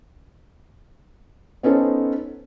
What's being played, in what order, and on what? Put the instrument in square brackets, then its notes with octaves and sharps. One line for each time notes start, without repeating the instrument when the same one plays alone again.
[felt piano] B3 C#4 D#4 A4 C5